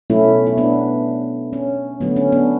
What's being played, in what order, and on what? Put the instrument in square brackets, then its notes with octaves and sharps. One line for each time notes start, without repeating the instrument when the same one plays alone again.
[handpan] B2 F#3 A3 C#4 E4
E4
B3 D4
C#4
D3 F#3 A3 B3
C#4
B3 D4